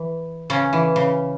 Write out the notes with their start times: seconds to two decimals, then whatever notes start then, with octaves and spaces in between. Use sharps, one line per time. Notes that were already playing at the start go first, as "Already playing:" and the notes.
Already playing: E3
0.50 C#3 C#4
0.73 E3
0.96 C#3